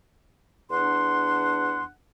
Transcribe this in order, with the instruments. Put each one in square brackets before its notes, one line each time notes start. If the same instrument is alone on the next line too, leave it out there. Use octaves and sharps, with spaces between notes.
[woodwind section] E2 D4 F#5 C6